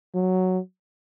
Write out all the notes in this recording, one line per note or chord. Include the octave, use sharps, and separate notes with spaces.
F#3